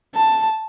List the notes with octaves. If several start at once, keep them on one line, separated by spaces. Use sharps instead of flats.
A5